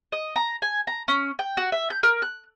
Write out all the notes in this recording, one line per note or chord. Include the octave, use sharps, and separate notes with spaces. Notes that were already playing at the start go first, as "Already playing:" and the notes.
D#5
A#5
G#5
A#5
C#4
G5
F#4
E5
G6
A#4
F#6